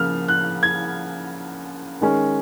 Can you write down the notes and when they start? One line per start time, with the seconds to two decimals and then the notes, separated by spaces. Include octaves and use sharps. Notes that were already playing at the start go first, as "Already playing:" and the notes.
Already playing: C#3 F3 A#3 F6
0.28 F#6
0.63 G#6
2.01 D#3 G#3 C#4